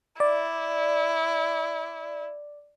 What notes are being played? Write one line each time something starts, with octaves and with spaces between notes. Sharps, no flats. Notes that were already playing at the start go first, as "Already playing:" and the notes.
E4 D5